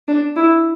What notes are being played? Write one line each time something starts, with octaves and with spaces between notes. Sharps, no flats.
D4
E4